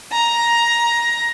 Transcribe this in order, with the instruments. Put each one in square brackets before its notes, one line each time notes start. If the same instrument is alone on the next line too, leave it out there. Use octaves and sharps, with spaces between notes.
[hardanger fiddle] A#5